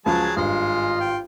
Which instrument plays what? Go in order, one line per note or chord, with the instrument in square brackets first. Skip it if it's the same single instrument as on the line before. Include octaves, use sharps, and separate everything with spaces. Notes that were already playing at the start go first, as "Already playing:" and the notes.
[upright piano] C#2 F3 F4 [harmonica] F#3 G#4 A5
[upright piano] G#1 G2 [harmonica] G#3 D#5 [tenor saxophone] F4
[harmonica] G5